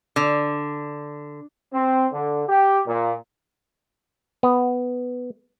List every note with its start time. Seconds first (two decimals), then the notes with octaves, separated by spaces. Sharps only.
0.16 D3
1.72 C4
2.13 D3
2.48 G4
2.86 A#2
4.43 B3